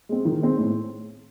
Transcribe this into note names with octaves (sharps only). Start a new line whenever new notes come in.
G#3 C4
D#3
G#3 C4
A2